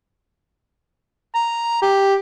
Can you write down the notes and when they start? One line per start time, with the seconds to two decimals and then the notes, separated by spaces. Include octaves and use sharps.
1.34 A#5
1.82 G4